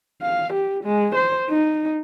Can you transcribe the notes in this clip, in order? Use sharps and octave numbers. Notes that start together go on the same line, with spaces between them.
F5
G4
G#3
C5
D#4